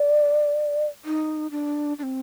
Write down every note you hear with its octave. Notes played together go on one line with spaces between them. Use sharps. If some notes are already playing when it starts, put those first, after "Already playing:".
Already playing: D5
D#4
D4
D4
C4